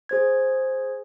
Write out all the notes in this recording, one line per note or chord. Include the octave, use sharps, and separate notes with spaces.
G#4 C5 G#6